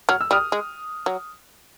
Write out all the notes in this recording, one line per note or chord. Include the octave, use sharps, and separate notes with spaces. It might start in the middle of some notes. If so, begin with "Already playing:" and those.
F#3 F6
E6
G3 D#6 F6
G#3
F#3